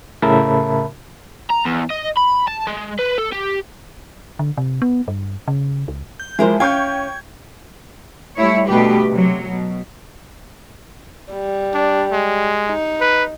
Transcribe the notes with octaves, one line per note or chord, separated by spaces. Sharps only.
A2 C#3 A#4 E5 A5 B5
A#5
E2
D#5
B5
A5
G#3
B4
A4
G4
D3
C3
B3
G2
C#3
C#2
G6
E3 F3 G#3 E4 A#4 C5
C#4 F5 G5 C#6 G6 G#6
G3 A3 E4 C#5
D2 B2 G3 A3 G4 B4
C3 F#3
B2
G3
D4
G#3
D#4
B4